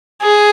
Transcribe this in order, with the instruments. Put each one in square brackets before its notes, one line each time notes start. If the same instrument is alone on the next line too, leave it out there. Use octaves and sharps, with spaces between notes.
[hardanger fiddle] G#4